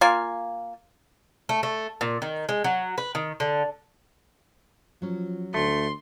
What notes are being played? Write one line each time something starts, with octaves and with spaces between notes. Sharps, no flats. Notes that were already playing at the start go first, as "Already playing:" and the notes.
A#3 F4 G#5
A3
A3
A#2
D#3
G#3
F#3
B4
D#3
D3
F3 F#3 C#4
D2 A3 C6